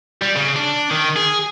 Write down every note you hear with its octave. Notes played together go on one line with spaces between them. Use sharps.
G3
C#3
D4
D#3
G#4